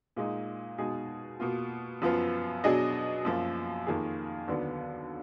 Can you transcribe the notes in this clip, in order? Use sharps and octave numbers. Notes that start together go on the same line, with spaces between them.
A#2 G#3 D#4
B2 G#3 D#4 G#4
B2 A#3 F4
F#2 F3 B3 F4
B2 F#3 D4 G#4 D#5
F#2 F3 A#3 F4
F2 D#3 A#3 F4 G#4
D#2 D3 F#3 B3